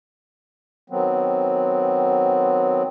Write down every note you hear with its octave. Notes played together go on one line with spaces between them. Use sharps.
D#3 F#3 B3 C4